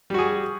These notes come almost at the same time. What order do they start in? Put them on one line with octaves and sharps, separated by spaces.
G3 F#4 G#4